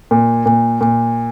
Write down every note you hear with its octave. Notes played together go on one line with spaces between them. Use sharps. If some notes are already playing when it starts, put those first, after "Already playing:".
A#2
A#2
A#2